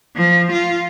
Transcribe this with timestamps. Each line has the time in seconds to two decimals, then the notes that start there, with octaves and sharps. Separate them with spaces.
0.16 F3
0.52 F4